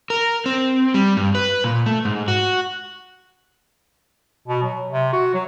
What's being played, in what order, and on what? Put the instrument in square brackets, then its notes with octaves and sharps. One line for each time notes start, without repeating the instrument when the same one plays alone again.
[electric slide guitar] A#4
C4
G3
G2
B4
A#2
A3
G#2
F#4
[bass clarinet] B2
F#3
C3
F#4
F#3